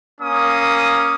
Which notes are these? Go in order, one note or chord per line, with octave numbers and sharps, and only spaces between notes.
A#3 C#4 D#6